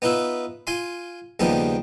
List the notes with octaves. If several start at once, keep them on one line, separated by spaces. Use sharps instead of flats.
B3 D#4 F4 B4 E5
F4 F5 G#5 C6
D#2 C#3 F3 G3 B3 D#4